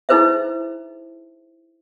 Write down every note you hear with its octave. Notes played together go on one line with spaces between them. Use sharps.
D#4 E4 G#4 B4 C5 E5